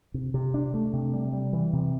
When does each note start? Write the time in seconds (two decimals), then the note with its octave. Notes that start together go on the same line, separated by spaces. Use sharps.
0.14 C3
0.34 C3
0.54 D4
0.74 A3
0.93 C3
1.13 G3
1.33 G3
1.53 E3
1.73 C3